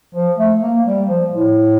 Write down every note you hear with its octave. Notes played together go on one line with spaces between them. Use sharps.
F3
A3
A#3
G3
F3
A2